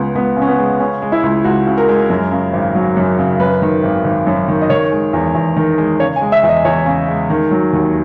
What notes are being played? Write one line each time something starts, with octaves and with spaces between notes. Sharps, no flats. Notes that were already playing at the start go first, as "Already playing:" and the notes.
Already playing: C#2 C#3 G#3 B3
C#2 B3
C#3
C#4
B3
G#3
C#3 C#4
G#3
E4
C#2
C#2 F#4
C#3
A#4
G#3
F#2
C#3
G#1
F#3
F#2
C#3
F#2 B4
D#3
G#1
G#1
F#2
D#3
D#5
D#3 C#5
G#3
E2
E2
D#3
G#3
C#3 C#5
G#5
G#3
E5
E2
D#5
E2 C#5
C#3
G#3
D#3
F#3
D#2